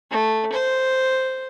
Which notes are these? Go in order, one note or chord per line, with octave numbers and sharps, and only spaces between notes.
A3
C5